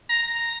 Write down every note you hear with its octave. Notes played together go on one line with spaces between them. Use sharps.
A#5